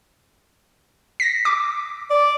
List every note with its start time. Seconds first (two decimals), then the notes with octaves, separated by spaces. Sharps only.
1.20 A#6 B6
1.45 D6
2.10 D5